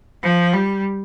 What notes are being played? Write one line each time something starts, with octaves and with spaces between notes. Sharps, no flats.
F3
G3